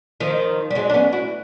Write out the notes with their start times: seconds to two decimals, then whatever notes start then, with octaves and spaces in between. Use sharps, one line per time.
0.20 D#3 F3
0.70 G3
0.75 F#3 G#3
0.90 D4
0.94 B3 C#4
1.12 E4 F#4